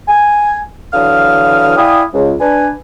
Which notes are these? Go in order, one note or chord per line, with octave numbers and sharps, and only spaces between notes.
G#5
D3 E3 F#3 F5 D#6 F6
E4 D5 F5 G5 G#5 D#6
C#2
D4 B4 G#5